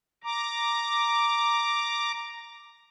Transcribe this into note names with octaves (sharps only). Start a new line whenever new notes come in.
A#5 D6